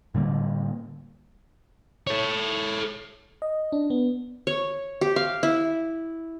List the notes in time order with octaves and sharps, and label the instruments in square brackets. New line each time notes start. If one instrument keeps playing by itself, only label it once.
[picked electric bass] A2 D3 G3 A#3
[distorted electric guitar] A4 C#5
[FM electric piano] D#5
D4
B3
[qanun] C#5
G4
F5
E4